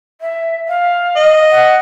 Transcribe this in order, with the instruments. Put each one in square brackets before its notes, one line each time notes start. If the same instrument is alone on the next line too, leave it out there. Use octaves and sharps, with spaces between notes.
[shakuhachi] E5
F5
[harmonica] D#5
[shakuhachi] F#5